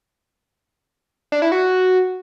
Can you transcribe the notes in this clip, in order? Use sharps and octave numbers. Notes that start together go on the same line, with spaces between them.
D4
E4
F#4